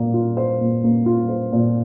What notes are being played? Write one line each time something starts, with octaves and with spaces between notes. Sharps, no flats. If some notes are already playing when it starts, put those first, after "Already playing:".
Already playing: A#2 A#3
F4
C5
A#2
A#3
F4
C5
A#2